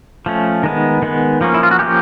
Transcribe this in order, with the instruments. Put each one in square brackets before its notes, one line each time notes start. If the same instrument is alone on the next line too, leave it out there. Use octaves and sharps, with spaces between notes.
[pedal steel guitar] F3 A3 C#4
D#3 G#3 B3
D#3 G#3 B3
F3 A#3 C#4
E4
F4
F#4
F3 A#3 C#4 G4